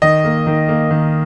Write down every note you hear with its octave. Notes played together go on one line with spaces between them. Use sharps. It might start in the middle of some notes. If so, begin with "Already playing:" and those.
D#3 D#5
A#3
D#3
A#3
D#3